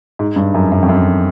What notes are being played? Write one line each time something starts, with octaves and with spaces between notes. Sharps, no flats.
G#2
G2
F#2
F#2
F2
F#2